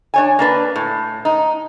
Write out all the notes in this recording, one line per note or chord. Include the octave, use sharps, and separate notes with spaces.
D4 C#5 G#5
A#3 D4 B4
A2
D#4